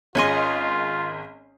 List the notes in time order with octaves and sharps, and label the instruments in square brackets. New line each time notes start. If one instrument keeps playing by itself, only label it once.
[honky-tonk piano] G#1 G#4 C6 [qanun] C#4 C#5 D#5 [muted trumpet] F4